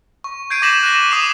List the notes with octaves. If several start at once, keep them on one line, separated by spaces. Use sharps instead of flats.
C#6
G6 G#6 C7 D7 D#7
D6 G6 A#6 B6 E7 F#7
F#6 A#6
D6 D#6 C7 D#7 F7